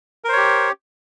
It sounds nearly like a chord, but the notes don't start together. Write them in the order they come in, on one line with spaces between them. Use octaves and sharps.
A#4 C5 C#5 G4